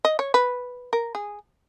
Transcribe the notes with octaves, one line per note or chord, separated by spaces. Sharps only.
D#5
C#5
B4
A#4
G#4